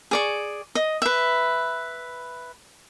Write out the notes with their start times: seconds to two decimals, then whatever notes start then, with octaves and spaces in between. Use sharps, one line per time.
0.11 G#4 D5 C#6
0.75 D#5
1.02 B4 E5